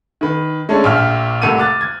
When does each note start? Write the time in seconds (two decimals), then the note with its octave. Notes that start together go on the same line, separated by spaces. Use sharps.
0.21 D#3 B4
0.69 G#3 A3 C#4 D4 A4
0.84 A#1 A#2 E5 G5 F6
1.42 C2 A3 A#3 F#5 E6 D#7
1.58 D6 F#6 A6
1.81 G#6